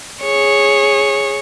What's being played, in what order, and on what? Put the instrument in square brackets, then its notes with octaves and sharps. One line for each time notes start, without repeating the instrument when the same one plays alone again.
[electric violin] G#4 C#5